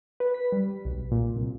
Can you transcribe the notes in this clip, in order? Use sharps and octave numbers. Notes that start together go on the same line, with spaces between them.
B4
B6
G3
B1
A#2
C2